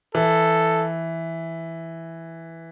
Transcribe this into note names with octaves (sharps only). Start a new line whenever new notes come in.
E3 A4